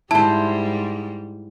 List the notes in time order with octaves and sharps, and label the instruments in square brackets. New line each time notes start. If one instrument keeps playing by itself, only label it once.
[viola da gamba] G#2 G3 [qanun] E4 C5 [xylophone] A5